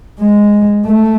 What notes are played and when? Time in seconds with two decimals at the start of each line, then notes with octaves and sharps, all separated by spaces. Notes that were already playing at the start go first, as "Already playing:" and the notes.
0.19 G#3
0.86 A3